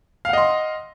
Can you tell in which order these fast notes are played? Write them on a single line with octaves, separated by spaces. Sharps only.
F5 F#5 D#5 C6